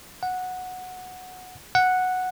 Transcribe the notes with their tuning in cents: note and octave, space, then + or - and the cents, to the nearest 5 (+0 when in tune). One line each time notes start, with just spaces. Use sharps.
F#5 -10
F#5 -5